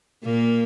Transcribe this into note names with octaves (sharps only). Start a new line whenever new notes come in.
A#2 A#3